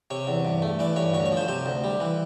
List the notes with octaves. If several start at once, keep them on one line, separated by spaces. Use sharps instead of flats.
C3 C#5
E2
G2
A3
E3 D5
G2 C#5
D2 C#5
C#5
F3
C5
C3 C5
D2
G3
E3